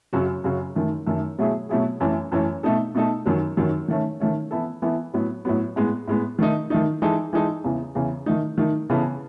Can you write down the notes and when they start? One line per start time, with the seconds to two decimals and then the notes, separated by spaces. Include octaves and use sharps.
0.13 F#2 C#3 F#3 C#4 F#4
0.44 F#2 C#3 F#3 C#4 F#4
0.76 F#2 D#3 A3
1.07 F#2 D#3 A3
1.39 B2 F#3 A3 E4 G#4
1.69 B2 F#3 A3 E4 G#4
2.00 F#2 E3 A3 C#4
2.32 F#2 E3 A3 C#4
2.63 B2 A3 D#4 A4
2.95 B2 A3 D#4 A4
3.26 F#2 D#3 F#3
3.57 F#2 D#3 F#3
3.88 D#3 A3 C#4
4.20 D#3 A3 C#4
4.51 E3 B3 E4 A4
4.82 E3 B3 E4 A4
5.14 A2 F#3 B3
5.45 A2 F#3 B3
5.76 A2 G#3 B3
6.08 A2 G#3 B3
6.39 D#3 A3 D#4
6.70 D#3 A3 D#4
7.02 E3 G#3 D#4 A4
7.33 E3 G#3 D#4 A4
7.64 E2 C#3 E3
7.95 E2 C#3 E3
8.26 D#3 A3 D#4
8.58 D#3 A3 D#4
8.89 C#3 E3 B3 E4 A4